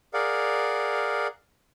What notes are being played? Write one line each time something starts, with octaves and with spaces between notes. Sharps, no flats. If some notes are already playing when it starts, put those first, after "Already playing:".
G#4 A#4 D5 F5 F#5